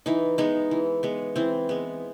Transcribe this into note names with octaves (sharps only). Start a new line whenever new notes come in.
E3 D#4
G#3 B3 D#4
E3
G#3 B3
E3 C4
G#3 B3